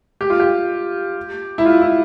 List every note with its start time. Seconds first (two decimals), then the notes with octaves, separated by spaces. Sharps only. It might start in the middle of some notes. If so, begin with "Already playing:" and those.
0.21 G4
0.30 F4
0.40 G4
1.58 E4
1.65 F4
1.81 E4